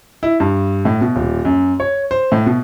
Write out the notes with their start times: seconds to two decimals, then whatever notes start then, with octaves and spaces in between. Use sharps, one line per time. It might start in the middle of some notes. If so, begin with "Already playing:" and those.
0.23 E4
0.40 G2
0.85 A2
1.01 B2
1.16 D#1
1.45 F#2
1.80 C#5
2.11 C5
2.32 A2
2.46 B2